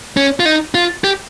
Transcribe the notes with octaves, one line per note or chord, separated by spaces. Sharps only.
C#4
F4
D#4
F4
G4